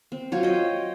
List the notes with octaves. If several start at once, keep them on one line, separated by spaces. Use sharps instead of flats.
C4
F#3 F4 C5 C#5
D#5 G5